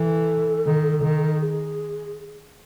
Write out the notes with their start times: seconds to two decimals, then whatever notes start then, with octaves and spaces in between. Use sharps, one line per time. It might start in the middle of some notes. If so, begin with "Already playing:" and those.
Already playing: E3 A4
0.67 D#3
1.03 D#3
1.41 G#4